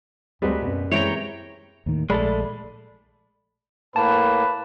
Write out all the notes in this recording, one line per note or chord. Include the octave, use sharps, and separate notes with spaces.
D2 G3 G#3 C4 F#4 A#4 B4
F#2 B2
D#2 E3 G#3 C4 C#5 G5 A#5
D#2 A2 D#3
A#1 G#3 A3 A4 D5 B5
A2 A#3 B4 A5